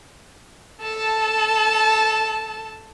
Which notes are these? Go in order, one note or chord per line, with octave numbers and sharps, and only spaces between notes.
A4 A5